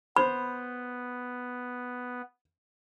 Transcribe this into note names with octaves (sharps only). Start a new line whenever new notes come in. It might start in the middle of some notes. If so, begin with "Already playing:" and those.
B3 C5 B5